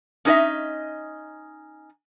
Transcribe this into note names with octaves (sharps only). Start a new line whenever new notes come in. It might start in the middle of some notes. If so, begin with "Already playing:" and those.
C#4 D#4 G#4 B4 D#5 E5